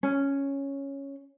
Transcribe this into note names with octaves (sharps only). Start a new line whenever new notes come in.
C#4